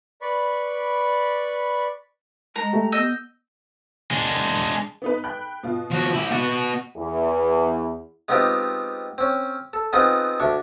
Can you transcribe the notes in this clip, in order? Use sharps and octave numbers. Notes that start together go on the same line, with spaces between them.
B4 D5 B5 C#6
G#3 A#5
A3 G4
B3 D#5 E6 G6
G#3 D4
B3 D#4 B4
G5 B5 F#6
B2 F4
F3 F#4
E4 G4
B3 F#4 A6 C#7
E2
G#3 B3 C4 D#4 F4 G4
C4 C#4
A4
B3 C4 D#4 F4 G#4 F#5
D2 D4 C#6